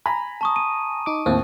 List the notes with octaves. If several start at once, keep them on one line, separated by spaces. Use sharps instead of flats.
G#5 A#5 B5
A5 C#6 D#6
D#7
D#4 D6
D#2 A2 C4